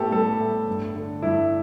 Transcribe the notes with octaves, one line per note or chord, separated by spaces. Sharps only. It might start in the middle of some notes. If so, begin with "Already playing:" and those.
Already playing: A2 B3 G4 A4
G3 A4
A2
G2
D3
G2 E4